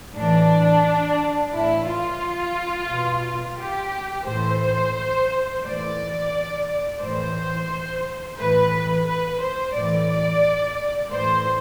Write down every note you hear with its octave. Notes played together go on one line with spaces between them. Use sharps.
A2 E3 D4
A2 E3 E4
F4
B2
G4
A2 E3 C5
A2 E3 D5
A2 E3 C5
A2 E3 B4
B4
C5
A2 E3 D5
A2 E3 C5